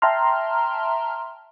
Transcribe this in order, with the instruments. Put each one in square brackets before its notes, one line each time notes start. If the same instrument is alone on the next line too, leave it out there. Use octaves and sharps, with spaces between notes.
[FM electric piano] E5 G5 A5 A#5 C6 F6